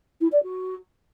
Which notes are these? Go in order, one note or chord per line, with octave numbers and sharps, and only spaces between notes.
E4
D5
F#4